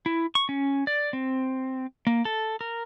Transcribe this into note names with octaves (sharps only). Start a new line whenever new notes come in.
E4
C#6
C#4
D5
C4
A#3
A4
A#4